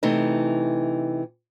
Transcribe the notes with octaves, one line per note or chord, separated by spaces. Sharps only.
C3 E3 A3 D#4